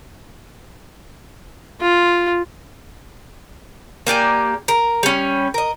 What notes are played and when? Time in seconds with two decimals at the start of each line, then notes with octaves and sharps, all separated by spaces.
1.81 F4
4.07 A#3 G4 D5 G#5
4.68 A#4
5.03 G3 C#4
5.54 A#4 D#5